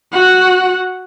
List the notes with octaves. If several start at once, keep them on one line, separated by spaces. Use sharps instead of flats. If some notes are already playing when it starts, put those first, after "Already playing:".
F#4 F#5